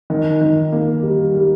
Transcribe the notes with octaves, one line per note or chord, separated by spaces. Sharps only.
D#3
D#3
A#3
G3
G3